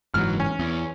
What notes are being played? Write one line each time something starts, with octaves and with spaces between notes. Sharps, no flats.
F#1 G#2 E3 F#3 F6
C#4
E2